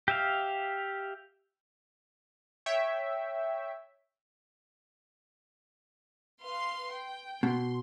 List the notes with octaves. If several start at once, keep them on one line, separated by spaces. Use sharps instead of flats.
G4 E5 F5
C#5 E5 G5
B4 F5 C6
G5
B2 C6